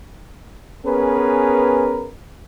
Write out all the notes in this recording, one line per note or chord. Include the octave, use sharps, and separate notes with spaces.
B3 C#4 G#4 A#4 B4